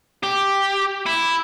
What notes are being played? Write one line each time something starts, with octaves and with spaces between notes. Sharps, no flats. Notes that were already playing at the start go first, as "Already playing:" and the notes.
G4
E4